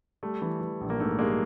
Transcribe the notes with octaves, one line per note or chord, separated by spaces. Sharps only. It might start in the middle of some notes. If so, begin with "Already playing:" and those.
G3 A3
E3
E3
A#1
A#3
G#2 A3
G3 G#3 A#3